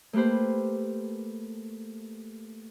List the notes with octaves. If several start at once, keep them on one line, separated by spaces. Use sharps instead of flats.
A3 A#3 G4 B4 C5